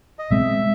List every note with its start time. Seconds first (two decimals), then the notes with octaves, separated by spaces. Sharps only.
0.19 D#5
0.30 B2 G#3 C4 E5